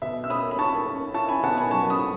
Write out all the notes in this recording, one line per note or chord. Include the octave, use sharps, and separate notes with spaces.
B2 E5
E6
C#4 B5 D#6
B5
C#4 A5 C#6
C#4
E4 A5 C#6
G#5 B5
B2 F#5 A5
G#5 B5
F#3 A5 C#6
B5 D#6
F#3